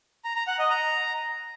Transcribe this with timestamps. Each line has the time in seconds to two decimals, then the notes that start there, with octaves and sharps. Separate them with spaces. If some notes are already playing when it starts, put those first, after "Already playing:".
0.25 A#5
0.36 A#5
0.47 F#5
0.59 D#5
0.70 A#5